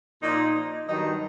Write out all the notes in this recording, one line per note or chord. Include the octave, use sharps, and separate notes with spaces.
A#2 F3 D#4
G2 D#3 F#3 D#4